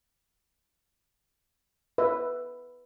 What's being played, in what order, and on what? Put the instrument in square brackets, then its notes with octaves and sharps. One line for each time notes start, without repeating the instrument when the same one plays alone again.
[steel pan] B4 E5